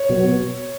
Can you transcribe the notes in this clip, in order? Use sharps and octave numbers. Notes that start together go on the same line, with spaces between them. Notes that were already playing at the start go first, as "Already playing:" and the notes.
Already playing: C#5
B2 F#3 B3